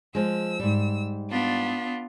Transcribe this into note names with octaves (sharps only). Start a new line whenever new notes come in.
F3 G#3 E6
G#2 G3
B3 D4 F4